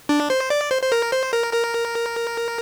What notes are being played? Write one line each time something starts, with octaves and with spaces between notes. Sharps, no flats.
D4
C5
D5
C5
C5
A#4
C5
A#4
A#4